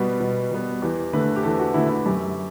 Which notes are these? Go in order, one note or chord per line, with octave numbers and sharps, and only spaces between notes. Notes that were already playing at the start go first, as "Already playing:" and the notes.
Already playing: B2 G3 B3 F#4
B2
G3 B3
E2 G4
D3 A3 B4
G4
E2 A4
F#4
D3 A3 E4
E4
F#2 G4